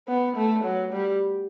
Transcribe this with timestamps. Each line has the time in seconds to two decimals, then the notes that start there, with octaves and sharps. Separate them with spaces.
0.08 B3
0.36 A3
0.64 F#3
0.93 G3